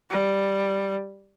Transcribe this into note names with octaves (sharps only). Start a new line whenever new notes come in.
G3